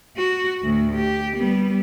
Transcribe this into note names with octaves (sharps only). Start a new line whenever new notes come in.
F#4
D2 A2
G4
G3 B3